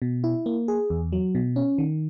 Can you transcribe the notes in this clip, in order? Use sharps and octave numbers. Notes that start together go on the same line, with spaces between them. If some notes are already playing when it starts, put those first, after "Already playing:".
B2
E4
A#3
G#4
E2
F#3
B2
C#4
D#3